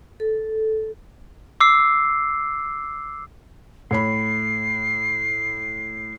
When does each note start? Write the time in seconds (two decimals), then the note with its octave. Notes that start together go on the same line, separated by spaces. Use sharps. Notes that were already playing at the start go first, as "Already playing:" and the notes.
0.20 A4
1.60 D6 E6 C7
3.91 A2 C#5 B5 C7